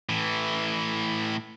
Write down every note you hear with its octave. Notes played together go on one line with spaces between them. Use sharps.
A2 E3